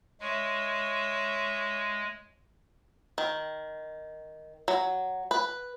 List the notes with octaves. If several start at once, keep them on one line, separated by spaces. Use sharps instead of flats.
G#3 C#5 E5
D#3
F#3
B4